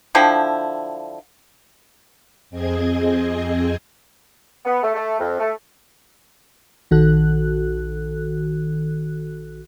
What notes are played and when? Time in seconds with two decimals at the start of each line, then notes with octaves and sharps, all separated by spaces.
0.15 D3 F3 E4 G5
2.50 F2 C4 G#4 D#5 G#6
4.65 B3
4.83 A3
4.95 A3
5.19 F2
5.39 A3
6.91 A#1 D#3 F#4 A4 F#6